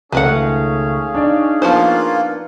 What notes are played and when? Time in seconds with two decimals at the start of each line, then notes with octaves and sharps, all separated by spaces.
0.12 C#2 D#3 A3 C#4 G#4 B4 F5 F#5
1.14 D4 D#4 D5
1.62 F3 A#3 B3 F4 C5